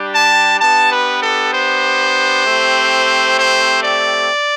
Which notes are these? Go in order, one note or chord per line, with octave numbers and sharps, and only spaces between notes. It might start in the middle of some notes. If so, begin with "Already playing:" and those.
Already playing: G3 D4 G4
A5
B3 D4 G4 A5
B4
A4
C5
A3 C4 G4
C5
D5